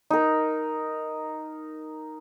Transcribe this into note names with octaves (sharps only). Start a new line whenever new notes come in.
D#4 A#4